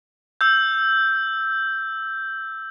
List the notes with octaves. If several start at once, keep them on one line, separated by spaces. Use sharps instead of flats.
E6 G6